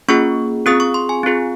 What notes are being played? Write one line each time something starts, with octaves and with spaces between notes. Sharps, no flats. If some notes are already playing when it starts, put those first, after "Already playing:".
A#3 C#4 F4 G#4 C#6
C4 F4 G#4 D#6
C#6
C6
G#5
C4 F4 G#4